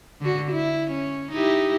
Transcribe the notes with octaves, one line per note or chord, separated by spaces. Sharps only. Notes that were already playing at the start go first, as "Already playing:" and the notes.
D3 F#4
E4
C#4
D#4 E4 G4